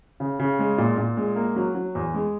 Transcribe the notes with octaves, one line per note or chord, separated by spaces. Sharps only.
C#3
C#3
G#3
A#2
A#2
G#3
A#3
F#3
F#3
E2
G#3